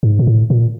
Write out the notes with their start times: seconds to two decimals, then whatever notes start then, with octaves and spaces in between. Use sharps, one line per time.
0.03 G#2
0.19 A#2
0.27 A2
0.50 A#2